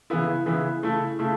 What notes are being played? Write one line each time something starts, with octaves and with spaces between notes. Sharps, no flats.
C#3 E3 B3 E4
C#3 E3 B3 E4
C#3 A3 E4
C#3 A3 E4